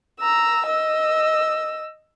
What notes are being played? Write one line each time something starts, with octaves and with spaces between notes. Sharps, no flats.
A#5 E6
D#5 E6